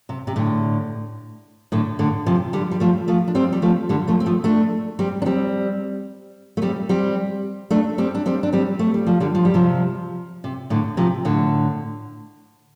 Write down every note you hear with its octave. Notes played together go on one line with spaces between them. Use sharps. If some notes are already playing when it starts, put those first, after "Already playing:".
C3
C3
A2 D3
A2 D3
A2 D3
C3 F3
D3 G3
G3
F3 A3
F3 A3
D4
G3 C4
G3
F3 A3
D3 G3
F3 A3
C4
F3 A3
A3 D4
G3 C4
D4
G3 C4
A3
G3 C4
G3 C4
A3 D4
G3 C4
D4
G3 C4
D4
G3 C4
A3
G3
F3
D3 G3
F3
G3
C3 F3
C3
A2 D3
C3 F3
A2 D3